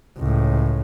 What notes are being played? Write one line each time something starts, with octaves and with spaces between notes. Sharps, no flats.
C#2 A2